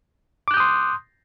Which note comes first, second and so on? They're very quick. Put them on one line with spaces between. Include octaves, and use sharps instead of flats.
D6 F#6 G6 D#6 C6